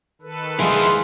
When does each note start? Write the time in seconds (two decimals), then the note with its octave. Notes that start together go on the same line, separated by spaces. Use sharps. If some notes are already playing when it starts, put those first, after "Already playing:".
0.22 D#3 A4 B4
0.59 C2 F3 G#3 E4 G#4 C6